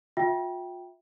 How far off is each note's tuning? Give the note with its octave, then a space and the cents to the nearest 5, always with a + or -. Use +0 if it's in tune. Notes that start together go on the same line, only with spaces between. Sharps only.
F4 +40 E5 +0 G5 -5